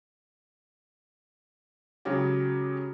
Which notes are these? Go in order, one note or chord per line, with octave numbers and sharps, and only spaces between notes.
C#3 F#3 G#3 G4